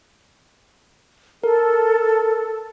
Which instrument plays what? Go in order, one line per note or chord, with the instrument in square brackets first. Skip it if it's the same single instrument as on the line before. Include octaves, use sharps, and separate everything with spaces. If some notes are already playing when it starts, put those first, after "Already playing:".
[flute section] A4 [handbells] A#4